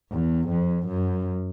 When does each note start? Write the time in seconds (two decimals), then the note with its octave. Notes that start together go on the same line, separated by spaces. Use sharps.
0.12 E2
0.49 F2
0.87 F#2